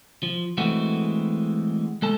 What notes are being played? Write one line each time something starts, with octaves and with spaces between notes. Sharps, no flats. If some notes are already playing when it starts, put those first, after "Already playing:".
F3
E3 G#3 A3 C4 F#4
G#3 A4 A5